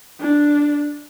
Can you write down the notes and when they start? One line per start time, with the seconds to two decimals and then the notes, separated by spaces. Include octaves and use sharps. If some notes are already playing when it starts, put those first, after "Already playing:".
0.20 D4